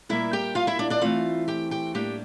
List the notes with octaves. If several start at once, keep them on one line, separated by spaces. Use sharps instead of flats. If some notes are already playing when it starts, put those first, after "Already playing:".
A#2 G3 A#3 E4 E5
G4 G5
F4 F5
E4 E5
D4 D5
D4 D5
E3 A3 C4 F4 F5
G4 G5
G4 G5
A2 G3 A#3 D4 G4 G5